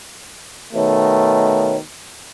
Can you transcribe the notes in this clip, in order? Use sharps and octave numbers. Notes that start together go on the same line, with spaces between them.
B2 D#3 A3 C#5